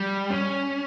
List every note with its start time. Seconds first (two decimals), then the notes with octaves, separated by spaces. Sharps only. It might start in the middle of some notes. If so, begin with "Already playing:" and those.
Already playing: G3
0.30 C#4